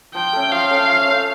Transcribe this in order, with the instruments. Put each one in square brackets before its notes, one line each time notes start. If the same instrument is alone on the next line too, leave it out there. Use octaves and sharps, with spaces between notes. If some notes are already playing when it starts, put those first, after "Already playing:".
[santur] F3 [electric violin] G5
[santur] A3 C#4
[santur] F3 [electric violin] F5
[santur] A3 C#4
F3
A3 C#4